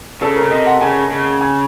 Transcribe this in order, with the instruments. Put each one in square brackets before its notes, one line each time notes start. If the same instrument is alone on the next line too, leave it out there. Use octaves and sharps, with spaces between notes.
[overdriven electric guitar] C#3 [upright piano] A4
[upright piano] A#4
[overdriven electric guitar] C#3
[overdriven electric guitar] C3 [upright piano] D#5
[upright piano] F#5
[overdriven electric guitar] C#3 [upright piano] G#5
[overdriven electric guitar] C#3
[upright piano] G#5